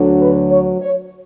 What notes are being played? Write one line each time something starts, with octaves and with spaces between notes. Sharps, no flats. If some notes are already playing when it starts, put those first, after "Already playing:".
Already playing: D2 D3 F#3
B4
C#5
C#5